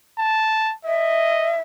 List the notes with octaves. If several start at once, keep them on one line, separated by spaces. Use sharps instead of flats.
A5
D#5 E5